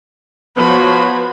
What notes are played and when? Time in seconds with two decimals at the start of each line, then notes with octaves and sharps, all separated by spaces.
0.57 F3 B3 F#4 C#5 B5